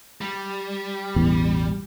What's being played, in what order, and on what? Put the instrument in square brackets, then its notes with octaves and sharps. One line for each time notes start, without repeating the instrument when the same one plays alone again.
[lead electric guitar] G3
[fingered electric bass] A1 E2 B2